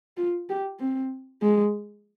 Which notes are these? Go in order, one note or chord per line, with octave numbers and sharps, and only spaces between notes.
F4
G4
C4
G#3